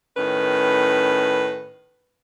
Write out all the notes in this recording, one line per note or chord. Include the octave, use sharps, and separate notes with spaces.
A2 D#3 C#4 B4